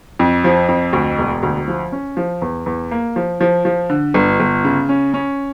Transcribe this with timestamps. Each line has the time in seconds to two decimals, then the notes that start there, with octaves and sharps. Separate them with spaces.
0.19 F2
0.44 F3
0.69 F2
0.93 D2
1.18 E1
1.43 D2
1.68 F3
1.92 C#4
2.17 F3
2.42 E2
2.66 E2
2.91 A#3
3.16 F3
3.41 F3
3.65 F3
3.90 D3
4.14 G1
4.40 G1
4.64 C#3
4.89 C#4
5.14 C#4